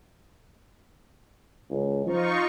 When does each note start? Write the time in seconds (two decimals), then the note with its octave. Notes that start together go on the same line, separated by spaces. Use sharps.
1.71 C#2
2.07 F3 D#4 F4 C#6